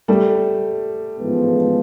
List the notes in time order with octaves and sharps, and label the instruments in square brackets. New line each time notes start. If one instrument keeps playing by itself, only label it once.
[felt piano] G3 A3
[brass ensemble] A1 G#2 F3 G#3 B3